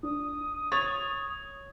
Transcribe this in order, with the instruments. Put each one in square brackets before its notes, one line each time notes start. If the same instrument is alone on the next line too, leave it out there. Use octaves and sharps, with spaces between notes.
[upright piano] D4 [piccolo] D#6
[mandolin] C#5 [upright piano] A6 F7